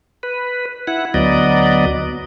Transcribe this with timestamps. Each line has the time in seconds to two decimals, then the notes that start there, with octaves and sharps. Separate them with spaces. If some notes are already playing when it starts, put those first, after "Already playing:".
0.23 B4
0.87 E4 F#5
1.14 D2 F#3 B3 D5 D#5